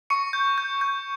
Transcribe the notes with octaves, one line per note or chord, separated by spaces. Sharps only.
C#6 C#7
G6
G6
G6